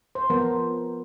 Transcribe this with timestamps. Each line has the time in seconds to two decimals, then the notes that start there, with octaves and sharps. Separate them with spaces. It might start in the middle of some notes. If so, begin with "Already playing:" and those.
0.15 C5
0.30 F3 B3 A#4